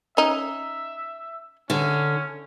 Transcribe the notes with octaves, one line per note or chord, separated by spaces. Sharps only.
C#4 D#4 E5
D3 C#4